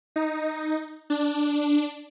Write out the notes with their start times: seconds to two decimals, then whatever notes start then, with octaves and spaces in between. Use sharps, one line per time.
0.16 D#4
1.10 D4